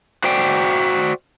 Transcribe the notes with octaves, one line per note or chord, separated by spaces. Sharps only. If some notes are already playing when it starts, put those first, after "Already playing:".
F#4 C5 D5 G5